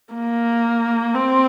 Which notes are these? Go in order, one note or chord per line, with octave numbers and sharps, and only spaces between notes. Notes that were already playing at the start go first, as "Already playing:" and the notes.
A#3
C4